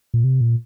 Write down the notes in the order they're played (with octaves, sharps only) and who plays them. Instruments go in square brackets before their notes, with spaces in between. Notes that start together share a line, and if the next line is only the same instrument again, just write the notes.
[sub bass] A#2
C3
A#2